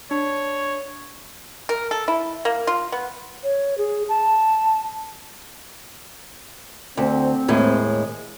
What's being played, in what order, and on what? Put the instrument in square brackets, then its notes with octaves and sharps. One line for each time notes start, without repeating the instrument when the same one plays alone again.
[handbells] D4 [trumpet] C#5
[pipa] A#4
A4
E4
A#3
F4
B3
[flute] C#5
G#4
A5
[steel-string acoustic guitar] D2 [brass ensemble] C4
[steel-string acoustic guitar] D#2 A2 G#3